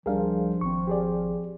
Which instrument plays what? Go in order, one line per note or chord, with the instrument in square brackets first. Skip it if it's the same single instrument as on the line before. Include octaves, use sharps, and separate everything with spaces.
[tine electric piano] C#2 G3 D4 [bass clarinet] F3 [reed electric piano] G#4 A#4 F5
[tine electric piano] G#1 C4 [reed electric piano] C#6
[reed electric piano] G4 G#4 D5